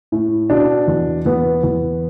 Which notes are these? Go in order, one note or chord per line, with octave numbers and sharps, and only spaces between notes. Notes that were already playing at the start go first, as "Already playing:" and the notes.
A2
B2 D4
E2
E2 B3
E2